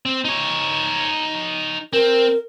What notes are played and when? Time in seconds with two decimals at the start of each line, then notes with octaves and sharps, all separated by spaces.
0.06 C4
0.25 D#4 C#5
1.93 C4 A#4